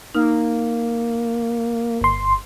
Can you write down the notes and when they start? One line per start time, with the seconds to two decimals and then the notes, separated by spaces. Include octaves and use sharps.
0.15 A#3 D#4 F6
2.01 G1 C6